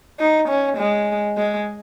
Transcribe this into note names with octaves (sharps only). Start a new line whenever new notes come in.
D#4
C#4
G#3
G#3